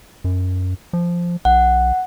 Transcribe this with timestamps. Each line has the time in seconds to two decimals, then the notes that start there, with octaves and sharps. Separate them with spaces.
0.24 F#2
0.93 F3
1.45 B1 F#5